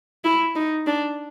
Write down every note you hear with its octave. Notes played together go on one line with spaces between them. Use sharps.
E4
D#4
D4